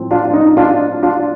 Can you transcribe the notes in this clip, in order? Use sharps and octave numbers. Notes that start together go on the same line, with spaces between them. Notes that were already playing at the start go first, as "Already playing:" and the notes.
Already playing: A2 F3 C4
D4 F4
D#4
D4 F4
D4 F4